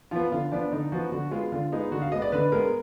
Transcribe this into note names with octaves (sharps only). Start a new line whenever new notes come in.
F3 B3 F4
D3 F4
F3 B3 D4
D3 D#4
F3 B3 F#4
D3 F#4
G#3 B3 F4
D3 F4
G#3 B3 D#4
D3 F#4
F5
G#3 B3 D#5
D5
D3 B4
G#3 B3 A#4